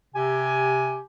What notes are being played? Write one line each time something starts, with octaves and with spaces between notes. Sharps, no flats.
C3 G4 G#5